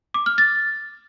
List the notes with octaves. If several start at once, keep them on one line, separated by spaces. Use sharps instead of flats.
D6
F6
A6